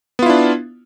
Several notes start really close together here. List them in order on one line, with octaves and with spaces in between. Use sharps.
B3 F4 E4 D4